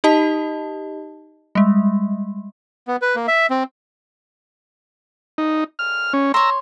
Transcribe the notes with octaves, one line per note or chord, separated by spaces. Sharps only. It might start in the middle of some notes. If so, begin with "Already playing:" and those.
D#4 G4 D#5 A5
G3 G#3
B3
B4
A#3
E5
C4
D#4
F6
C#4
C#5 A#5 C6 E6